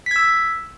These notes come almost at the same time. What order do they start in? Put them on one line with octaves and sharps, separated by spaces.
B6 G#6 E6